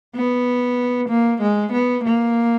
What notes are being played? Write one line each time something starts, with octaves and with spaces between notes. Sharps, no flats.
B3
A#3
G#3
B3
A#3